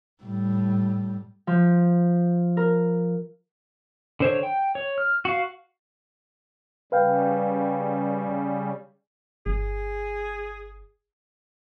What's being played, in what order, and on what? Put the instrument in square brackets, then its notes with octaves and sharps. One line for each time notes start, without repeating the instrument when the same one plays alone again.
[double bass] A2 G3
[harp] F3
A#4
[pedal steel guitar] D3 C5 C#5
G5
C#5
F6
F#4 F5
[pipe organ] C#3 G3 [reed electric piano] B4 F5 G5
[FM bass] G1 [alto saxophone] G#4